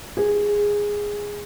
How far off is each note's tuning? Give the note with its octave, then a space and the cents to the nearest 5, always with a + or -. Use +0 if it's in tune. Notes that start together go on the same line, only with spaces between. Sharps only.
G#4 -10